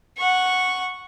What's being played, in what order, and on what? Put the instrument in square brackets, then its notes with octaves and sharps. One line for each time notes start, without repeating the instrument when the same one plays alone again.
[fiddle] F#5 C#6